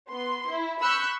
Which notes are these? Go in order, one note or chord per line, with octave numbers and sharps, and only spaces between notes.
B3 C6
E4
B5 C#6 E6 F#6 G6